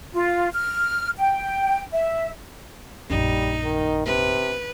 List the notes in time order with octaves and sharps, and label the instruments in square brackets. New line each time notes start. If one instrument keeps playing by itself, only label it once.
[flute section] F4
F6
G5
E5
[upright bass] A#1 F#2 [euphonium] G3 [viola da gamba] D#4
[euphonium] D#3
[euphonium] C3 [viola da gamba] B4